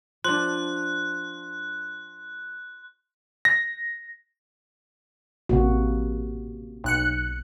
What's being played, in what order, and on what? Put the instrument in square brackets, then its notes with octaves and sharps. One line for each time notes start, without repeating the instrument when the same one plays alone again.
[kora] F3 D4 [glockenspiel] C6 [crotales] F#6
[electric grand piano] A#6
[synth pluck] A1 [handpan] C3 A#3 F#4
[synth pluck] B1 F#6 C#7